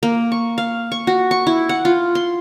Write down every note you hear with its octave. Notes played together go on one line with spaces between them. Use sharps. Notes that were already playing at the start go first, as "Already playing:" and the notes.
A#3
C#6
F5
C#6
F#4
C#6
E4
F#5
F4
C6